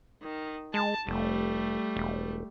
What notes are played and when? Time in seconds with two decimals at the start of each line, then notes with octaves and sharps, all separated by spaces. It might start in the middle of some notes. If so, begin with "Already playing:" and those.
0.22 D#3
0.74 G#3 A5
1.07 F1 G3 A3
1.96 E1